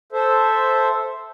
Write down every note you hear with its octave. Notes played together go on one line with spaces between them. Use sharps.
A4 C5 E5